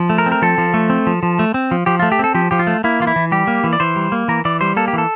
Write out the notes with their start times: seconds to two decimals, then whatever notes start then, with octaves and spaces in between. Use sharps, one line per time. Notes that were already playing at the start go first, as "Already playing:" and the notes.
Already playing: F3
0.10 A3
0.18 A#4
0.26 C4
0.32 A#4
0.42 F3 A4
0.58 F3
0.74 A3
0.90 C4
1.07 F3
1.23 F3
1.39 A3
1.54 C4
1.71 F3
1.86 F3 G4
2.00 A3 F4
2.12 G4
2.19 C4 A4
2.35 F3 G4
2.51 F3 G4
2.59 F4
2.67 A3
2.84 A#3 E4
3.00 E3 F4
3.07 E4
3.16 E3
3.32 G3 G4
3.47 A#3
3.64 E3
3.73 D5
3.80 E3 C5
3.96 G3
4.12 A#3
4.28 E3 A#4
4.45 E3 D5
4.61 G3 C5
4.77 A#3 A4
4.88 G4
4.93 E3 A4